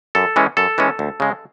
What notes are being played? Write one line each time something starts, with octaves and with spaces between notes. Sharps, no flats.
F#2 A4
E3 G#3 C#4
F#2 A4
E3 G#3 C#4
D2
C#3 G#3